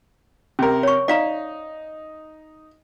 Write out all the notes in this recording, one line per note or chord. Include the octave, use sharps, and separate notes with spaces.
C3 C#4 A#4
C#5 C#6
D#4 D5 F5 A#5